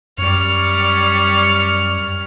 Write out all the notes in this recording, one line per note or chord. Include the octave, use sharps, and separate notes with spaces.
F#2 G3 C#5 F6